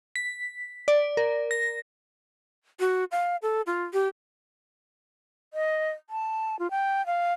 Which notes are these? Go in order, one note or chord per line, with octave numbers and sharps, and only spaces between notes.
B6
D5
A#4
A#6
F#4
F5
A4
F4
G4
D#5
A5
F4
G5
F5